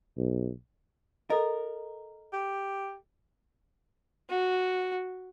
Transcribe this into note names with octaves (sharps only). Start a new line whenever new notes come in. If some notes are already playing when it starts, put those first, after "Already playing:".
B1
A4 A#4 D#5
G4
F#4